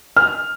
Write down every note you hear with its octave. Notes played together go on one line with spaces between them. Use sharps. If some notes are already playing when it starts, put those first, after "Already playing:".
F6